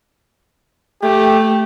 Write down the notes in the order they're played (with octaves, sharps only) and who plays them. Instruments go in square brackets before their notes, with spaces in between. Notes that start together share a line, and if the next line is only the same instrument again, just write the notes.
[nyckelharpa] A3 [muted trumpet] G4